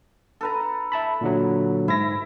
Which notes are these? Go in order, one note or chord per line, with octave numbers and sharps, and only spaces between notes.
A4 B4 A#5
E5 A5 B5
A#2 D3 F#3
G#2 E4 A#6